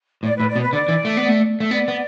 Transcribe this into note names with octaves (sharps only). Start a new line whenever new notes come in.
A2 D5
B4
A2
D5
B2
B4
D3 D5
E3
A3
B3
A3
A3
B3 D5
B3